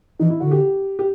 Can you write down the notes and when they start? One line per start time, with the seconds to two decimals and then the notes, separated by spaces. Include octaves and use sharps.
0.19 E3 D#4
0.30 E4
0.40 D3 F#4
0.51 G4
0.99 G4